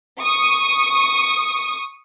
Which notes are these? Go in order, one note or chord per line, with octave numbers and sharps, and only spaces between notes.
C#6 D#6